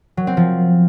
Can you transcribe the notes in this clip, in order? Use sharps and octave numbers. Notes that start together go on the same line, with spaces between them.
F#3
C4
F3